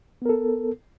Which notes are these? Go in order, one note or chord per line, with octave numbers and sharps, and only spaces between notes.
B3 A4 A#4